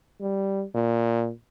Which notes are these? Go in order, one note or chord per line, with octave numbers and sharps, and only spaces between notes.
G3
A#2